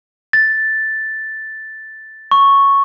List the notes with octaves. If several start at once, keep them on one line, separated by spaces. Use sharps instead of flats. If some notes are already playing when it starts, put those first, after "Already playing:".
A6
C#6